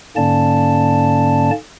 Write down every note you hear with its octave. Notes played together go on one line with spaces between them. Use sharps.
G#2 D3 A#3 C#4 D5 A5